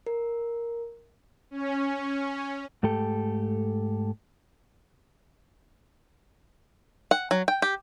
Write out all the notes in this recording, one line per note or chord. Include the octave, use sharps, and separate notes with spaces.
A#4
C#4
G#2 A3 G4 A4
F#5
F#3
G5
G4